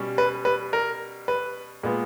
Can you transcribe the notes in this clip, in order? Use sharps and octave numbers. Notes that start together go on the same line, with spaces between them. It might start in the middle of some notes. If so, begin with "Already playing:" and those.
Already playing: B2 G3 C#4
B4
B4
A#4
B4
A#2 G#3 B3